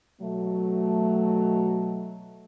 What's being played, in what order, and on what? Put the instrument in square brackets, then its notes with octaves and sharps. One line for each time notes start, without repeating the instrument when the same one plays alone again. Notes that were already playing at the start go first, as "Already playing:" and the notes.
[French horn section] B2 F#3 A3